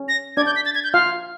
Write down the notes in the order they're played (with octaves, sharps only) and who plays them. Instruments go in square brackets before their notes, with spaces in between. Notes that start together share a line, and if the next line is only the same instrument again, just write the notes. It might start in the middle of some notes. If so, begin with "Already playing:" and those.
Already playing: [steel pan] C#4
[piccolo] A#6
[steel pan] D4 D5 [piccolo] G#6
[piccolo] G6
B6
A6
G#6
G6
[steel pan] F4 F5 [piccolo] F6